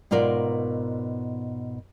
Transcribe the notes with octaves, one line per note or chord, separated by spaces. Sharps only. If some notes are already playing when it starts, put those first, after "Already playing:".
G#2 B2 F4 A#4 D5